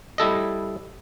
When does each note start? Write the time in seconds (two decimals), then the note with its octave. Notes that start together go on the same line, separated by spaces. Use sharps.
0.18 G3 E4 A4 D#5